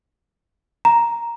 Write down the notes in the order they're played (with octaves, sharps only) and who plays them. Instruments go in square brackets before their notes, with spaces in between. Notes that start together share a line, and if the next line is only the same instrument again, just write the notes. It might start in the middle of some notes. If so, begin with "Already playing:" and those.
[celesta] A#5